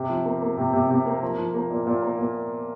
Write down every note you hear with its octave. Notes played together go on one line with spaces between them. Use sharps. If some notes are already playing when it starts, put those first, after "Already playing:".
Already playing: C3
F3
A#3
A#3
C3
C3
C3
A#3
F3
F3
A#3
A#2
A#2
A#3
A#2